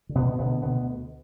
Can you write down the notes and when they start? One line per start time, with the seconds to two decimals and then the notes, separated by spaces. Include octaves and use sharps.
0.09 D3
0.15 B2 B3
0.27 D2
0.39 B2 B3
0.45 D3
0.62 D2 B2 B3